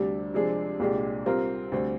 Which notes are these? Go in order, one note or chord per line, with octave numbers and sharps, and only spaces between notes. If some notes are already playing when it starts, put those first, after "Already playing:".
Already playing: D2 C3 G3 D4
C3 F3 G#3 D4 G#4
C2 A#2 G#3 D4 G4
C3 G3 C4 F4 A#4
D2 C3 G3 C4